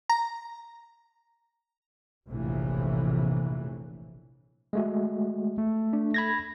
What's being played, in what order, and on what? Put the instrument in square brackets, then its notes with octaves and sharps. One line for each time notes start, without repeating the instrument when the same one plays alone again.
[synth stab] A#5
[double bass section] F1 A#1 A2 C3 E3
[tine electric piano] G#3 A3 F#4
[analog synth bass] A3
[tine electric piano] D4
B5 G#6 A#6